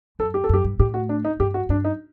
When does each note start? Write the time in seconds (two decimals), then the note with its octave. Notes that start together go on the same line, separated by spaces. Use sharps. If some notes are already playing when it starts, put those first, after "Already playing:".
0.19 F#2 A4
0.34 G4
0.44 A4
0.49 F#2 G4
0.64 G2
0.79 A2 G4
0.94 F#4
1.09 D4
1.25 D#4
1.40 G2 G4
1.54 F#4
1.69 G2 D4
1.85 D#4